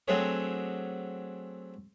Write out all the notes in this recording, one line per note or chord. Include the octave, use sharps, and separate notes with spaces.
F#3 A3 C4 D4 G#4 C#5